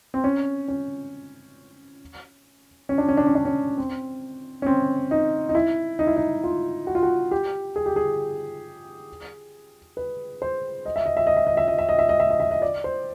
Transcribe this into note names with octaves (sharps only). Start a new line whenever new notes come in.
C4
C#4
C#4
C#4
D4
C#4
D4
C#4
D4
C#4
C4
C#4
C4
D#4
D#4
E4
D#4
E4
D#4
F4
F#4
F4
F#4
G4
G#4
G4
G#4
B4
C5
D#5
E5
D#5
E5
D#5
E5
D#5
E5
D#5
E5
D#5
E5
D#5
E5
D#5
E5
D#5
D5
C5